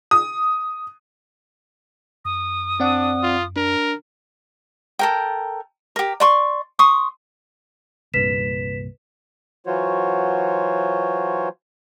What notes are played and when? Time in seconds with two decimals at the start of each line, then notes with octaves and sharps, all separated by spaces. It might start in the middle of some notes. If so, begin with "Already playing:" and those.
0.11 D#6
2.25 F#2 D#6
2.80 C4 D4 D5 F#5
3.23 F4
3.56 D4 A#4
4.99 A4 A#4 G5
5.96 G4 A#4
6.20 D5 C6 C#6
6.79 C6 C#6 D#6
8.14 C2 G2 A#2 B4 B6 E7
9.66 E3 F#3 F4 F#4 C5 C#5